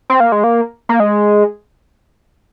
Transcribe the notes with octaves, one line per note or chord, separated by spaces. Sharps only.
C4
A#3
G#3
A#3
A#3
G#3